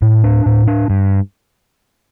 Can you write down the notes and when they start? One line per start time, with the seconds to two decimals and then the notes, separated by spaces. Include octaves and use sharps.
0.02 A2
0.24 D4
0.46 A2
0.68 D4
0.90 G2